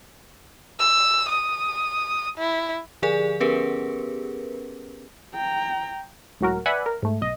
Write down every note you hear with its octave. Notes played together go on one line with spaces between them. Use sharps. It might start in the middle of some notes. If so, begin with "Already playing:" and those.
E6
D#6
E4
D3 F3 G#4 D5 G#5
B3 C#4 G4 G#4 A#4 B4
G5 A#5
C#2 A2 F#3 F#4 A#4
B4 D5 E5 F#5 G#5 B5
A#4
G#2 A3
B1 D#5